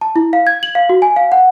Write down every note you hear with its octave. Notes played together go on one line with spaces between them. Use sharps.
A5
E4
F5
G#6
F#7
F5
F#4
G#5
F5
F#5